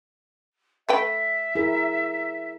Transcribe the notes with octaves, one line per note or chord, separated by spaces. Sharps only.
A3 B4 E5 G5
E4 G#4 A#4